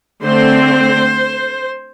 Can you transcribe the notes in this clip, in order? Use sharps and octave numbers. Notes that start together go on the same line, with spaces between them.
D3 A3 C4 C5